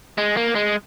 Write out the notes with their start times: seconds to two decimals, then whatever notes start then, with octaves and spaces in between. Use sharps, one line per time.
0.18 G#3
0.37 A#3
0.55 G#3